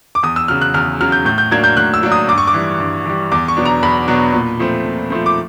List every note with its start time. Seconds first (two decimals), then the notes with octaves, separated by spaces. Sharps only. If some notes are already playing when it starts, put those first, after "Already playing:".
0.15 D6
0.23 E2 D#6
0.36 E6
0.48 C#3 F#3 F6
0.61 F#6
0.74 E2 F6
1.01 C#3 F#3 F6
1.12 G6
1.25 A2 G6
1.38 G6
1.51 F#3 A#3 D4 G#6
1.64 G6
1.77 A2 F#6
1.94 E6
2.03 F#3 A#3 D4
2.12 D#6
2.28 G2 D6
2.38 C#6
2.47 D6
2.54 E3 G3
2.80 G2
3.06 E3 G3
3.32 E2 D6
3.48 C#6
3.57 B2 F#3 B3 D4
3.65 A#5
3.83 E2 B5
4.08 B2 F#3 B3 D4
4.33 A#2
4.59 F3 A3 C4
4.85 A#2
5.10 F3 A3 C4
5.26 D6